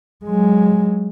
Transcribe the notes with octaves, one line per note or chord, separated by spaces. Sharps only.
F#3 G#3